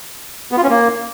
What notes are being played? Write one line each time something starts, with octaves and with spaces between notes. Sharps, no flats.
B3
F4
C#4
A#3